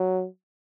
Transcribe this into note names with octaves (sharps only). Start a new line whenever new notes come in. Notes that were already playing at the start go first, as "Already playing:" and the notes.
Already playing: F#3